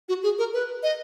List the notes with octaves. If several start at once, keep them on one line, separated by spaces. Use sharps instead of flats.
F#4
G#4
A#4
B4
D#5